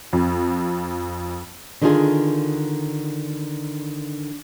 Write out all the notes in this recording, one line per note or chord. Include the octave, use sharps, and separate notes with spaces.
F2
D3 D#3 D4 E4 F4 G#4